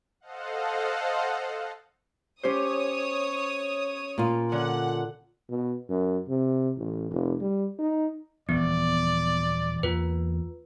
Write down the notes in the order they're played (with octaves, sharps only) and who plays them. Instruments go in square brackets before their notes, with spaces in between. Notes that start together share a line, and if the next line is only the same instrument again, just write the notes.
[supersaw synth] A4 C5 D#5 F5 F#5
[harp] C#4 G4 C5 [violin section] C#5 D#6
[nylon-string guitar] A#2 F4
[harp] D3 C#4 [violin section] F#5
[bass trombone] B2
F#2
C3
A1
F1
G3
D#4
[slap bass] D#1 E3 F3 [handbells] B3 [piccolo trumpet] D5
[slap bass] E2 A#3 [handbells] F4 B4